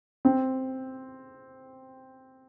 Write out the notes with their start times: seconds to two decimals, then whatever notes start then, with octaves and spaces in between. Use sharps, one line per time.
0.25 C4